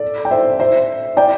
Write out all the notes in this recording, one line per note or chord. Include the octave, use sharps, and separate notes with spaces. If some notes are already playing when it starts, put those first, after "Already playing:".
Already playing: A4 D5
G5
C5 E5
C5 E5
D5 G5